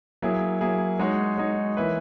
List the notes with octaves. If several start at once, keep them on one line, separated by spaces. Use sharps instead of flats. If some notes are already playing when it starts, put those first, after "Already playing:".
F#3 A#3 E4 G#4
F#3 A#3 E4 G#4
G#3 D#4 F#4 C#5
G#3 D#4 F#4 C#5
E3 A#3 E4 B4